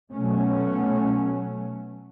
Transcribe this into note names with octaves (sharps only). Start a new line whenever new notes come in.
B2 F#3 A3 C#4